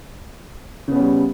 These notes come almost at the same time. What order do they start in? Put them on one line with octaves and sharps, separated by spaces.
C#3 B3 C#4 G3